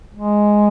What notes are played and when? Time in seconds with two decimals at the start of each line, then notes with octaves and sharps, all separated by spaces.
0.15 G#3